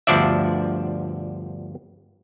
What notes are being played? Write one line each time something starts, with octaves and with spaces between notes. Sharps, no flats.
G1 D2 F3 D4 D5 E5